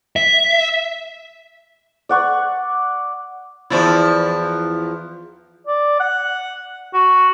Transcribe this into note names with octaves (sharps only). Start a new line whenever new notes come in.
E5
D5 F#5 C#6
E2 F3 E4
D5
F#5
F#4